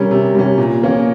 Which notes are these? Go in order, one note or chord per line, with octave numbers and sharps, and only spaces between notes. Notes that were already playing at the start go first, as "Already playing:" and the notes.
Already playing: C3 G3 C#4 A#4
C3
G3 C#4
A#2
F3 A#3 C#4